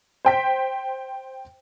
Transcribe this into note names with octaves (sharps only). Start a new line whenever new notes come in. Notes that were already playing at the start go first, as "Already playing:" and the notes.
C5 G5 B6